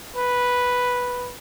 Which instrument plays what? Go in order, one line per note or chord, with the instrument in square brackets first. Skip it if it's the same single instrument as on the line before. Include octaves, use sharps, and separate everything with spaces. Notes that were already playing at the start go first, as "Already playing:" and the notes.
[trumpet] B4